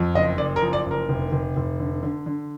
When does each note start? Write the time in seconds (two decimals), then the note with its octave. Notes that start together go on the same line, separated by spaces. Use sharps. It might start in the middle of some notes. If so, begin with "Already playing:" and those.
Already playing: F2
0.14 F#1 D#5
0.38 F#1 D5
0.56 A#4
0.62 F3
0.73 D5
0.86 F#1 A#4
1.09 F1
1.32 F1
1.56 F1
1.79 D3
2.03 D3
2.26 D3